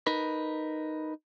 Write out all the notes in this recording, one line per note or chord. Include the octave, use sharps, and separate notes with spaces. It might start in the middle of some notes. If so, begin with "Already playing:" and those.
D#4 A#4 B4